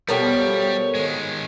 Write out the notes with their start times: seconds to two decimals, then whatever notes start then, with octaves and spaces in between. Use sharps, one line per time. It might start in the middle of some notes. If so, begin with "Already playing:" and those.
0.09 B2 F3 G3 B3 G4 A4 A#4 C#5
0.95 D#3 G#3